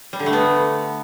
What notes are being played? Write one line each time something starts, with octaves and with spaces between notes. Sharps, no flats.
G3
D3
A3
B3